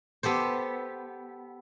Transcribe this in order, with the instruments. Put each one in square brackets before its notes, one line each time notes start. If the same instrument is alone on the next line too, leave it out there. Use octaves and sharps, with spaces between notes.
[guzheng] B3 G4 A4 C5